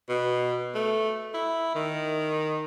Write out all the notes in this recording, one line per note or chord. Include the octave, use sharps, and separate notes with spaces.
B2
A3
E4
D#3